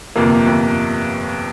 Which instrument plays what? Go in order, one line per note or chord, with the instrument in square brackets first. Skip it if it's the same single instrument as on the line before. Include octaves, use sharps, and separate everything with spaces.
[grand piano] G1 F2 C3 [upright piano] A#3
[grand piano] G1 F2 C3